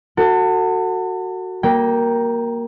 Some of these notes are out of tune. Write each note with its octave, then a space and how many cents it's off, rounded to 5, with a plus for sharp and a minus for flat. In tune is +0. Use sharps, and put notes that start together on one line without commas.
F#4 +0 A4 +35
A#3 +5 G5 +0 A#5 +45